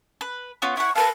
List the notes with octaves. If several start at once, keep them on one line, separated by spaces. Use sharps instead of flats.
B4
B3 C#4 F4
E4 F#5 C#6
A#4 B4 F5 A5